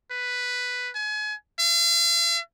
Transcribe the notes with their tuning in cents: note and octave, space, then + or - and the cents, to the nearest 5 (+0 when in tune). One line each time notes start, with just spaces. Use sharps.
B4 +5
G#5 +35
F5 -45